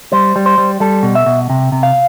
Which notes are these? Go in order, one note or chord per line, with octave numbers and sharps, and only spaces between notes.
G3 C5
G3
C5
G3
G3 A4
B2
E5
B2
C3
C3
F5